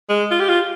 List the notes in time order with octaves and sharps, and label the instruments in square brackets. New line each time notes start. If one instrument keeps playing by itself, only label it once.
[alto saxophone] G#3
F4
G4
F4